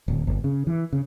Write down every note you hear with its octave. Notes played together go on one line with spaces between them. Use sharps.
D1
G1
C#3
E3
C#3